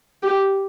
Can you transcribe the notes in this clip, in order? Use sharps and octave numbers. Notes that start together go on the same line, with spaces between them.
G4